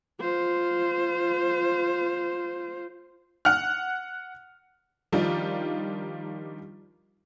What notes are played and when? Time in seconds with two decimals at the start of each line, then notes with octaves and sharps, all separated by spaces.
0.20 F4 C5
3.45 F#5 F6
5.12 D#3 F3 G3 D4 D#4 F4